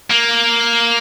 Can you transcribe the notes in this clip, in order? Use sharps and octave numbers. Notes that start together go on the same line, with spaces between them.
A#3